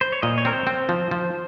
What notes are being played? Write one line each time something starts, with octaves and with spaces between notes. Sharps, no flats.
C5
C#5
A#2 D#5
C#5
C4 A#4
C5
C4
F3
F3